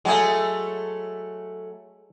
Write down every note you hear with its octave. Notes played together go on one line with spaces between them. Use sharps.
F#3 G#3 A3 G#4